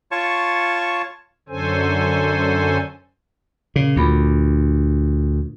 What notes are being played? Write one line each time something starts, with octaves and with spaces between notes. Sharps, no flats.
F4 C#5 A5 C#6
F#2 D3 C#4 A4 C5 G#5
A#2 C#3
D2 D4 F4 B5